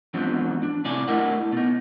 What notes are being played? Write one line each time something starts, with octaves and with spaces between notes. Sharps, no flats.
E2 G#2 F3 F#3 C4 D4
D4
A2 C3 D5 G#5
A3 D4 E4 A#4 D#5 F#5
B2 D#4